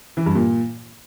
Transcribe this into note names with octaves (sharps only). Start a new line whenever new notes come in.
E3
G2
A#2